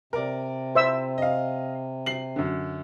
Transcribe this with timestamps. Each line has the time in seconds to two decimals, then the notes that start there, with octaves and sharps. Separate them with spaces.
0.13 C3 A#4 D5
0.75 C5 E5 E6
1.18 D#5 F5
2.06 C7 F#7
2.36 F#2 D3